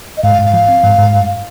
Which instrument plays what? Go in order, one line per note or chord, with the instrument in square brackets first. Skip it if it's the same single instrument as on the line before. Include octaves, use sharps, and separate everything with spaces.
[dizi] D#5
[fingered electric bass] G#2 [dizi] F5
[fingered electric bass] G#2
[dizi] F5
[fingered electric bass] F3
C4
G#2
G#2
G2